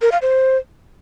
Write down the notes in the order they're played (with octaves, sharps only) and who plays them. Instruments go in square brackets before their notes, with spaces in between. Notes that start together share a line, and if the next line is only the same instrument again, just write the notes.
[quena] A#4
F5
C5